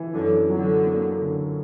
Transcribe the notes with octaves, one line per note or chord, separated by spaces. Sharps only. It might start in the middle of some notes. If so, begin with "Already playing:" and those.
Already playing: E3
F#2 D3
D3 F#3
A#3
D3